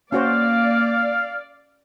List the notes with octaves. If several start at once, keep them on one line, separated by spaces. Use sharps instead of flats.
A#3 C#4 F#4 C5 D5 F5